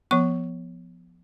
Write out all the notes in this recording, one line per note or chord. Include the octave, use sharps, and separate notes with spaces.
F3 B3 C#6